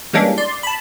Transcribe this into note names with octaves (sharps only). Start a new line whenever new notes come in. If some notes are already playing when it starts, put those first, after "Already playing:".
E3 G3 G#3 A#3 C#4 D4
D5 C6
A5 B5